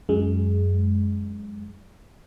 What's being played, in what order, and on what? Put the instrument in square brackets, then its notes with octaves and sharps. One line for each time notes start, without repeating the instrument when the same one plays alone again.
[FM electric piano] F#2 G#3